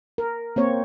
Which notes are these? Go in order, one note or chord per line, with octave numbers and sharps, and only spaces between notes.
A#4
A#3 C4 C#5